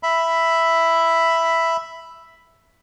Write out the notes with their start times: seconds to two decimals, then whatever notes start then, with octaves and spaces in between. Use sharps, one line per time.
0.03 E5 B5